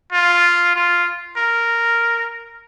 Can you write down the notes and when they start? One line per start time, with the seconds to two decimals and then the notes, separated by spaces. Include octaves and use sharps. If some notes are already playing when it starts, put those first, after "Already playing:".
0.12 F4
0.75 F4
1.37 A#4